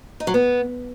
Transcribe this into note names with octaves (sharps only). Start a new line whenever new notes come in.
D#4
F#3
B3